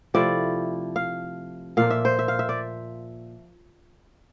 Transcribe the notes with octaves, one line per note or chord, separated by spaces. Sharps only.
C3 F3 A3 E4 D5
F5
A#2 F3 A#3 F5
E5
C5
E5
F5
E5
D5